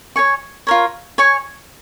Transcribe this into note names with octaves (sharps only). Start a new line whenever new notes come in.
C#5 G#5 C#6
F4 A#4 C#5
C#5 G#5 C#6